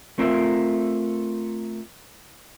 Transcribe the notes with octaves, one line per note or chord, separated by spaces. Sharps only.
A3 C4 F4 A#4 E5